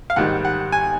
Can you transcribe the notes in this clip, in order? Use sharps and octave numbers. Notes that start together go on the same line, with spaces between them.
F5
G#2 D#3 G3 F#5
F#5
G#5